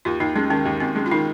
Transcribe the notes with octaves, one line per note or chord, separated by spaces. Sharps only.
D#2 F4
D#2 D#4
G#3 C#4
D#3 C#4
D#2 A#3
D#2 C4
G#3 C#4
F4
D#3 D#4